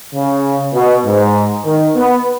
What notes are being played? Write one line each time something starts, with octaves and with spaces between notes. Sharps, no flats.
C#3
B2
G#2
D#3
B3